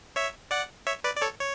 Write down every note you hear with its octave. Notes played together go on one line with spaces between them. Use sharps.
C#5 E5
D5 F#5
C#5 E5
B4 D5
D5
A4 C#5
C#5